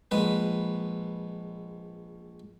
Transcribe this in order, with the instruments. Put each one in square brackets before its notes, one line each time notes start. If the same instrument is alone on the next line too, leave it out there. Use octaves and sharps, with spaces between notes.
[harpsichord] A#1 G#3 B4